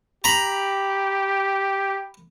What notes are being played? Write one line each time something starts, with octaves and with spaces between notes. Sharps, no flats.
G4 A#5 B5